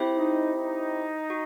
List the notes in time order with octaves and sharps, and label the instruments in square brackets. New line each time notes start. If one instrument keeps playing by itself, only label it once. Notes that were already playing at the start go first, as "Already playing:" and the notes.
Already playing: [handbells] C4 E4 G4 C5 E5
[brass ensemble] D#4
D#4
[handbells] F#4